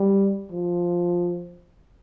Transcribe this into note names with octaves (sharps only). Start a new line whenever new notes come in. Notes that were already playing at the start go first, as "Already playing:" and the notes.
Already playing: G3
F3